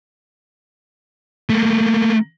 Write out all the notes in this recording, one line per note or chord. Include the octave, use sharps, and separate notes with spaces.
A3 A#3